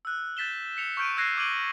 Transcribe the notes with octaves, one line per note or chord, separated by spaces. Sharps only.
E6 F#6
G6 A6 B6 E7 G7
B6 C#7 F7
C#6 F6 G6 D7 D#7
E6 F#6 G#6 A#6 C7 D#7
D6 G#6 D7 D#7 F#7 G7